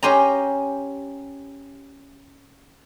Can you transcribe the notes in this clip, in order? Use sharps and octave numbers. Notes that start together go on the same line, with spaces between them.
C#4 G4 C5 D#5 G#5 A#5